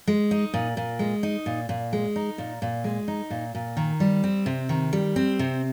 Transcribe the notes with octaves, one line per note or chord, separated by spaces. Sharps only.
G#3
D#4
A#2
A#2
G#3
D#4
A#2
A#2
G#3
D#4
A#2
A#2
G#3
D#4
A#2
A#2
D#3
G3
C4
C3
D#3
G3
C4
C3